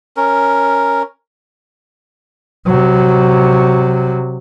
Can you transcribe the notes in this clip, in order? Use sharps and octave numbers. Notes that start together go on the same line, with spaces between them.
C#4 A#4
C3 F#3